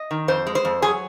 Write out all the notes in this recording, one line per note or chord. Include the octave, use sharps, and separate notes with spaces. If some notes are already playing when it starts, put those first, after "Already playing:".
Already playing: D#5
D#3
F2 C5
G#3
C5
F2
F#3 G#4